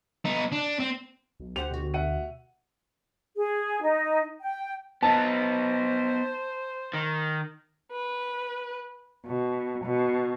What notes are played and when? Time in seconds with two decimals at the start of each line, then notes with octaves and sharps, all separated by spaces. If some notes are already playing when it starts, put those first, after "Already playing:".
0.25 B3 D#4
0.52 D4
0.80 C4
1.40 B1
1.56 D2 G4 C5 F#5 F7
1.71 B2 F#4
1.94 E5 F#5 D#7
3.37 G#4
3.82 D#4
4.41 G5
5.03 B3 D#4 C5 A5
6.94 D#3
7.92 B4
9.26 B2
9.84 B2